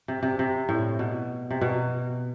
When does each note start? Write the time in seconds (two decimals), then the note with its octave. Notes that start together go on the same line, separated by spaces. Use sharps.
0.08 C3
0.23 C3
0.39 C3
0.69 A2
0.99 B2
1.50 C3
1.61 B2